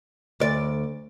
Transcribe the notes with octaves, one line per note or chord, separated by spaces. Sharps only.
D2 D5